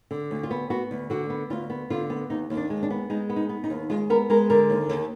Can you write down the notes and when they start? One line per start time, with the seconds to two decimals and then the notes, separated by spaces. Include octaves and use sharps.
0.11 D3
0.31 D2
0.43 F4
0.51 B3
0.70 B3 F#4
0.91 D2
1.10 D3 F#4
1.30 B3
1.50 D2 F4
1.70 B3
1.90 D3 F4
2.10 B3
2.30 D#2 D#4
2.50 D#2
2.57 D4
2.70 G#3
2.83 D4
2.91 B3
3.10 G#3 D#4
3.30 B3
3.36 D#4
3.49 B3
3.64 D#4
3.70 D#2
3.90 G#3 F4
4.10 B3 A#4
4.30 G#3 A#4
4.50 D3 A#4
4.70 D#2
4.89 D#2